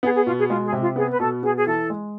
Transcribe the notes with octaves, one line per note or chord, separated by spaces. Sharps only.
B3 G#4
G#4
B2 F4
G#4
G#3 F4
G#4
C3
F4
B3 G#4
B4
B2 A4
B3 G#4
G#4
E3 A4
G#3